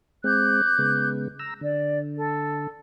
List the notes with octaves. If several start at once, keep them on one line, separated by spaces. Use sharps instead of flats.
G#3 C4 D6 F#6 G6
C#3 G#3 B3
A#5 E6
D3 D5
A4